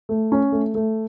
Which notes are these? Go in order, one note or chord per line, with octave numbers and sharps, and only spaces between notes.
A3
C#4
A3
A3